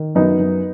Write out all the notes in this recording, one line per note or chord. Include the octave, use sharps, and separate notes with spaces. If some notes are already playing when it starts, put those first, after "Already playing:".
Already playing: D#3
F#2 B3 D#4
F#2